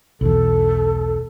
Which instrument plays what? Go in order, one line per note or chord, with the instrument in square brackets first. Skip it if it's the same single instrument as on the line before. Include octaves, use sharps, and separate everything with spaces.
[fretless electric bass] B1 E2 [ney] A4